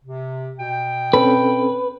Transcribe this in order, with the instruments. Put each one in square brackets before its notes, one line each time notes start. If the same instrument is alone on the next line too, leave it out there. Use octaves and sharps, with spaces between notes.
[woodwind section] C3
B2 G5
[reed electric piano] C4 C#4 A4 [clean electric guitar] B4